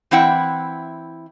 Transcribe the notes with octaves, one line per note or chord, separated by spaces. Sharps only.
E3 C4 E4 F#5 G5